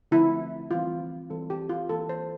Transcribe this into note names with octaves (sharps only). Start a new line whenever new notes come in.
D3 F3 A3 C4 E4
E3 G3 C4 F4
E3 G3 C4 A4
G4
F4
E3 A#3 A4
C5